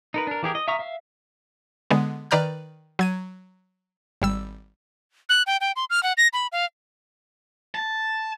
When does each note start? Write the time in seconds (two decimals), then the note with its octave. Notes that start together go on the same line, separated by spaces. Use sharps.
0.14 D#4 A#4 B4
0.27 D4 A#4
0.43 E3 G4 G#4 A#4
0.55 D#5
0.68 E5 F5 A#5 C#6 D#6
0.79 E5 F5
1.91 D3 G#3 B3
2.31 D#3 B4 D5 A#5 F6 G6
2.99 F#3 G#6 D#7
4.22 G#1 G3 E6
5.29 F#6
5.47 G5
5.61 G5
5.76 C6
5.90 F6
6.03 F#5
6.17 A#6
6.33 B5
6.52 F5
7.75 A5